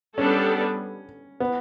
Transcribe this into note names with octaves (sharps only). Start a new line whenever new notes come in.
G3 B3 C#4 D4 A4 D5
B3